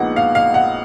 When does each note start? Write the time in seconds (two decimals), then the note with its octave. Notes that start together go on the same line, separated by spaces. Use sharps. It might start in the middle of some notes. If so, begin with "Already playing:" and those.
Already playing: A#1 A#2 G#3 B3 D#4 F#5
0.16 F5
0.35 F5
0.54 F#5